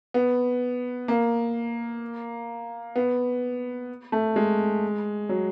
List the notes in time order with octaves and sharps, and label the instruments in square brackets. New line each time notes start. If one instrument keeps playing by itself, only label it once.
[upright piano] B3
A#3
B3
A3
G#3
F#3